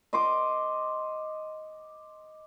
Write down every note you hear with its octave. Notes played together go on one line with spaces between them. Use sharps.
D#5 C6 D6